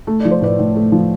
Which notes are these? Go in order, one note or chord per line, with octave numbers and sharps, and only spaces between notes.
A3
F3 D5
C5
A2 B4 D5
A2
A3
F3